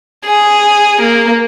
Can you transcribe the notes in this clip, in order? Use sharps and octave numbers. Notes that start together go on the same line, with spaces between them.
G#4
A#3